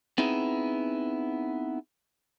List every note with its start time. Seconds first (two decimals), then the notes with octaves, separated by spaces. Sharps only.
0.18 B3 C4 D#4 E4 G#4